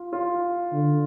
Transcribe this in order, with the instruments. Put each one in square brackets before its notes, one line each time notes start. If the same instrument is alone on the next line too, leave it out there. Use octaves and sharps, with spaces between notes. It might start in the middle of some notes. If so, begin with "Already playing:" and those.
Already playing: [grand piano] F4
F4
[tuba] D3